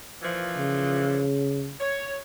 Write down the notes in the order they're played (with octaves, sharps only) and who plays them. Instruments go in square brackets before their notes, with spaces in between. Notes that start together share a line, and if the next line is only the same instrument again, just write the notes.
[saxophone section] A#2 E3 F3
[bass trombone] C#3
[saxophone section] C#5